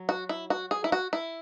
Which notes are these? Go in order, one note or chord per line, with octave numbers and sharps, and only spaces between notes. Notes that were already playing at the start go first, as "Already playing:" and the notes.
Already playing: F#3
F#4
E4
F#4
G#4
E4
F#4
E4